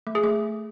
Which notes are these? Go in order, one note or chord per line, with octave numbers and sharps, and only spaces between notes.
A3
G#4
A3